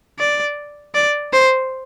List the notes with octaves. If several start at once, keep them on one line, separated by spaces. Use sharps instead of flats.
D5
D5
C5